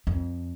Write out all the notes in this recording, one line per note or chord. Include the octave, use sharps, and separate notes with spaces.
F2